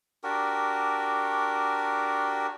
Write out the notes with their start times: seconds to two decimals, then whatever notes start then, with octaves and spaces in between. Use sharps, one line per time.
0.24 D4 F#4 G4 A#4